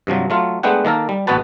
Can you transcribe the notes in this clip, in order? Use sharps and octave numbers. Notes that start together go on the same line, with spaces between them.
G2 C3 F3 F#3
F#3 A3 F4
G#3 A3 B3 D4 G4 F#5
D#3 A#3 A4 A#4
G3
A1 B2 B3 F#4 B4 A5